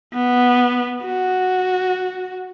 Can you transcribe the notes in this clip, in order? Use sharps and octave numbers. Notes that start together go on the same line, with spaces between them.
B3
F#4